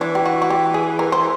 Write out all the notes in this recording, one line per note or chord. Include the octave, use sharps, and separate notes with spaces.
E3 D4
G4
F#4
F#4
G4
G#4
A#4
C5